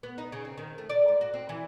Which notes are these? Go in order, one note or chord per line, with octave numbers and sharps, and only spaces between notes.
B3
D#4
C#3
C4
D#3
A3
D5
G#2
F#4
C4
E3